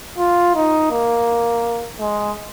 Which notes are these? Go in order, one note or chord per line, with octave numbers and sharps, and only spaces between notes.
F4
D#4
A#3
G#3